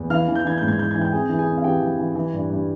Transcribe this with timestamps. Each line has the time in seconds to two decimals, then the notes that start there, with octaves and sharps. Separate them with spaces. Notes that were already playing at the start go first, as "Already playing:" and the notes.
Already playing: E2
0.10 E3 F5 F6
0.28 E3
0.35 G6
0.44 E3 G#6
0.58 G#2 G6
0.68 G#6
0.79 E3 G6
0.91 E3 G#6
1.01 G5 G6
1.12 F2 G#4 G#5
1.29 E3
1.39 G#4 G#5
1.47 F2
1.58 F5
1.64 E3 G4 G5
1.81 E3
1.99 E3
2.15 E3
2.33 G2
2.50 G2